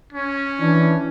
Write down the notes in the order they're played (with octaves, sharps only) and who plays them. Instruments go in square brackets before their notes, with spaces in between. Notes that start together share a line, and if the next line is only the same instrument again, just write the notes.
[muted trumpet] C#4
[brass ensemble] E3 D4